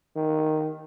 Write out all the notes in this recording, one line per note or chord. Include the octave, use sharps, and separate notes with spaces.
D#3